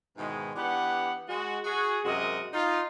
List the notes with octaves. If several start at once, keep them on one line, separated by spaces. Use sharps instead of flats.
G#2 B2 D#3 E3 G#3
E3 B3 D4 G4 F#5
G#3 F#4
F#4 G#4
F#2 C3 G#3 F#4 A#4 D#5
D#4 F4